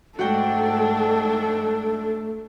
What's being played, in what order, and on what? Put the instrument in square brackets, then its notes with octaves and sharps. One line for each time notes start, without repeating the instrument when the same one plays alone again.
[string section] G#2 D4 [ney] A3 [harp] F#4 F#5 G5 [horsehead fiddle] A4